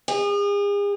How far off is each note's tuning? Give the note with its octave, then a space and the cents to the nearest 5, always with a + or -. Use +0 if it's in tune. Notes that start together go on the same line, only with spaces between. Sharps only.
G#4 -40